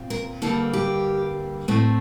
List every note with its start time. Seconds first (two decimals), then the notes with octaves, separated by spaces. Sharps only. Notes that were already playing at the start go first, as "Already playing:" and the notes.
Already playing: A#2 C4
0.10 A#4
0.42 G2 D3 G3 A#3 A4
0.73 G4
1.68 A2 A3 C4